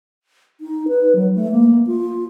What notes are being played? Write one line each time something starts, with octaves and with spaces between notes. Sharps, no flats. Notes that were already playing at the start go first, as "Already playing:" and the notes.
D#4
B4
F#3
A3
A#3
F4